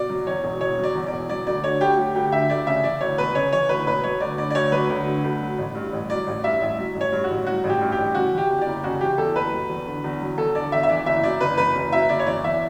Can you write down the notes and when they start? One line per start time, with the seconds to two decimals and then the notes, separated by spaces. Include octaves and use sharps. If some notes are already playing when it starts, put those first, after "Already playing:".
Already playing: B2 D5
0.10 F#3
0.26 E2 C#5
0.44 E1
0.61 B2 C#5
0.78 F#3
0.84 D5
0.95 E2
1.07 D5
1.13 E1
1.29 F#3 D5
1.47 D2 D5
1.64 D3 C#5
1.81 D2 G4
1.98 F#3 G4
2.15 D2 G4
2.32 D3 E5
2.50 D2 D5
2.66 C#3 E5
2.83 E3 D5
3.01 D2 C#5
3.18 E1 B4
3.35 C#3 C#5
3.52 E3 C#5
3.69 D2 B4
3.86 E1 B4
4.04 F#3 C#5
4.20 D2 D5
4.38 D3 D5
4.50 D5
4.55 D2 C#5
4.72 F#3 B4
4.89 D2
5.07 D3
5.24 D2
5.41 F#3
5.58 A1
5.75 G2
5.92 A1
6.10 F#3 D5
6.27 A1
6.44 G2 E5
6.61 A1
6.78 F#3
6.95 A1
7.01 C#5
7.12 G2
7.24 F#4
7.29 A1
7.47 F#3 F#4
7.64 A1
7.69 G4
7.81 G2
7.92 G4
7.98 A1
8.15 C#3 F#4
8.32 E3
8.38 G4
8.49 E2
8.61 F#1 D5
8.84 C#3 F#4
9.01 E3 G4
9.18 E2 A4
9.35 F#1 B4
9.52 F#3
9.70 E2
9.86 D3
10.04 E2
10.21 F#3
10.38 E2 A4
10.55 D3 D5
10.72 E2 E5
10.83 E5
10.89 E3 D5
11.06 F#1 E5
11.24 F#2 D5
11.40 F#1 B4
11.57 E3 B4
11.75 F#1
11.92 F#2 E5
12.09 F#1 D5
12.19 C#5
12.26 E3 D5
12.44 E2 E5